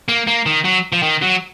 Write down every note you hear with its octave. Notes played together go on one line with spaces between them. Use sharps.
A#3
A#3
D#3
F#3
F3
D#3
F#3